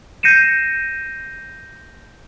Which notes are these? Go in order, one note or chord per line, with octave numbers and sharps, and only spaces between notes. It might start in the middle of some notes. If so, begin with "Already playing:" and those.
G6 A#6 C7 C#7 D#7 E7